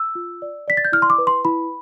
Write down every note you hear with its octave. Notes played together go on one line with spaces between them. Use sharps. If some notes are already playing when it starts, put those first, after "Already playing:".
Already playing: E6
F4
D5
D5 B6
A6
G6
E4 F6
C6
D6
B4
C6
E4 B5